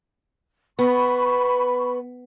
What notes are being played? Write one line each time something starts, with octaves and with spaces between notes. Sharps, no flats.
B3 B5 C#6